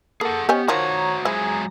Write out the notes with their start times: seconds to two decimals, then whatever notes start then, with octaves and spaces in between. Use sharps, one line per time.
0.21 A#3 G#4 A4 F#5
0.49 B3 C#4 G4 C5 D#5 G#5
0.68 D#3 F3 F4 F#4 C5 C#5 F#5 A#5
1.25 F3 F#3 G#3 E4 G#4 G#5